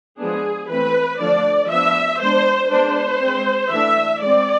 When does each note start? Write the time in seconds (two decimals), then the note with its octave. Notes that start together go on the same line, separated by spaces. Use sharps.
0.18 F3 G#3 B3 D4 G#4
0.69 E3 A3 C4 B4
1.19 D3 F3 A3 D4 D5
1.69 F3 B3 D4 E5
2.20 G#3 B3 D4 C5
2.71 G#3 B3 D4 C5
3.22 G#3 C4
3.71 E3 A3 D4 E5
4.21 G#3 C4 D5